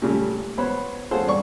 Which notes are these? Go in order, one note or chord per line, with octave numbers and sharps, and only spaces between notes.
A#2 C#3 G3 A3
B3 C5 C#5 B5
F4 G#4 A4 C5 C#5 F#5
G2 D5 C#6